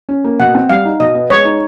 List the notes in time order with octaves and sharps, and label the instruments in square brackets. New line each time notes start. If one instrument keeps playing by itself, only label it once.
[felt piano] C#4
A#3
[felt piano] B2 [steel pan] F#5
[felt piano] C4
[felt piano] G3 [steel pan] F5
[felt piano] D#4
[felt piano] B2 [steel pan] D#5
[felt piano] B3
[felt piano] G#3 [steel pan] C#5
[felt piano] D#4